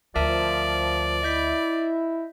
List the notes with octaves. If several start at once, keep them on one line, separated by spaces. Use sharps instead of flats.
D2 F3 A#4 D5 E5 A5
E4 D#5 G6 B6